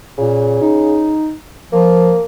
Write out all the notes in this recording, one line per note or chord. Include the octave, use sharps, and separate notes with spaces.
A#2 C#3
D#4
F3 A#3